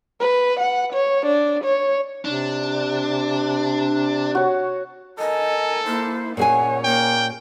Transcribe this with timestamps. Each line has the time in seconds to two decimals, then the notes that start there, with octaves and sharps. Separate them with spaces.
0.20 B4
0.60 F#5
0.93 C#5
1.26 D4
1.64 C#5
2.25 C3 D4
4.35 F#4 C#5
5.19 A4 A#4 D#5 G#5
5.87 A#3 E4 C5
6.37 A#2 C#4 G#4 C#5 F#5 G#5
6.85 A#3 G5